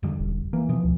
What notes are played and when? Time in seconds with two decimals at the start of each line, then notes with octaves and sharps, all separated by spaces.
0.03 E2 D3 G3
0.19 E1
0.53 E3 A#3
0.69 B2 F3 B3
0.84 D2